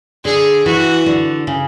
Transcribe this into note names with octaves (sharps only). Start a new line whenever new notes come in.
D3 G#4
E3 F#4
D3
C#3